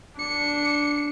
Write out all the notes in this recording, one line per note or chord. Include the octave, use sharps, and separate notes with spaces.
D4 C#7